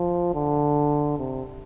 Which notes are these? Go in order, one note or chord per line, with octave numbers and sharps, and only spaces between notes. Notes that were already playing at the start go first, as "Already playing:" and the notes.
Already playing: F3
D3
C3